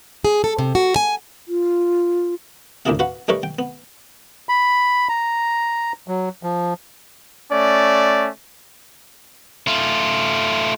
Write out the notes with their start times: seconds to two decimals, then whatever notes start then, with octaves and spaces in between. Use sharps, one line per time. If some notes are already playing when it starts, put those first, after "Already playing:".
0.25 G#4
0.44 A4
0.59 C3
0.75 F#4
0.96 G#5
1.48 F4
2.85 D2 A2 A#3 E4 G#4 F5
2.99 F#4 B4 F5 F#5
3.28 G3 A3 D#4 A#4 B4 C#5
3.43 G5
3.59 B3
4.49 B5
5.09 A#5
6.08 F#3
6.43 F3
7.51 A3 C#4 D5
9.68 A3 F4